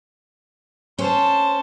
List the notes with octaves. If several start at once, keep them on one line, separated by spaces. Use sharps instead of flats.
C#4 C5 A5